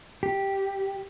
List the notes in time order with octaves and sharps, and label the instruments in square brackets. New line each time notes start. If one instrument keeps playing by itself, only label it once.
[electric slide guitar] G4